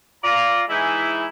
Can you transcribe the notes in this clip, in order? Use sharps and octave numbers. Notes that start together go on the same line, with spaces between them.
F4 D5 A#5
E3 G#3 D#4 E4